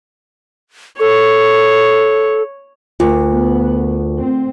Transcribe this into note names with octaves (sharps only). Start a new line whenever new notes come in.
A4 C#5
D2 F4 A#4
B3
C4